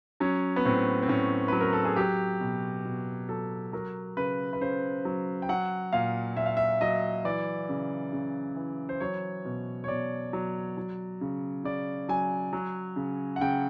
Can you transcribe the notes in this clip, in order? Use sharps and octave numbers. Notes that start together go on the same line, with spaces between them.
F#3 C#4
B3
A2 C4
C4
A2 C#4
F#3 B4
A#4
A4
G#4
F#3 G4
B2
B2
F#3 A4
F#3 A#4
C#3 B4
B4
C#3 C5
F#3
G5
F#3 F#5
A#2 F5
A#2 E5
F5
E5
F#3 D#5
E3 D5
C#3
C#3
E3
C5
F#3 C#5
B2
C#5
B2 D5
F#3
F#3
C#3
C#3 D5
F#3 G#5
F#3
C#3
F#5
C#3 G5